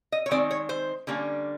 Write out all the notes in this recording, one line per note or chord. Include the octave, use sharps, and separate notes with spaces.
D#5
C#5
D#3 G#3 C4 D5
C#5
C5
D3 G3 A#3 C#4